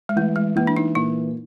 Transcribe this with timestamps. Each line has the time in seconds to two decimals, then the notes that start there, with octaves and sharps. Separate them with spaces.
0.09 G#3
0.16 E3 A3
0.36 G#3
0.56 E3 A#3
0.67 D4
0.77 D#4
0.95 A#2 E4